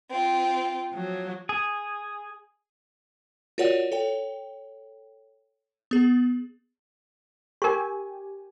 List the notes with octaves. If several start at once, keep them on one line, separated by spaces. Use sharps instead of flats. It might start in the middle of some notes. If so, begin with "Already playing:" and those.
C4 F4
F3 F#3
G#4
F4 F#4 A#4 C#5 D5 F#5
A4 C#5 G5
B3 G#4
G4 A#4 G#5 C#6